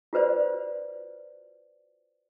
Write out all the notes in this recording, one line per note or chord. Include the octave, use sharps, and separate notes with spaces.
F4 F#4 B4 C5 D5